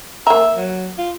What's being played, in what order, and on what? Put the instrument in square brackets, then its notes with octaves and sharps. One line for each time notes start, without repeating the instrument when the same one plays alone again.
[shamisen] A#3 A#5 [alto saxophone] E5
[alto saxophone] F#3
F4